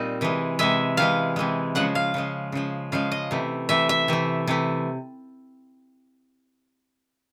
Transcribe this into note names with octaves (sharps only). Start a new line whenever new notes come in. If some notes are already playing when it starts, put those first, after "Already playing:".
Already playing: A#2 G3 C4 D#4 D#5
C3 E3 G#3
C3 E3 G#3 E5
C3 E3 G#3 F5
C3 E3 G#3
C#3 F3 G#3 F#5
F5
C#3 F3 G#3
C#3 F3 G#3
C#3 F3 G#3 F5
D#5
C3 E3 A3
C3 E3 A3 E5
E5
C3 E3 A3
C3 E3 A3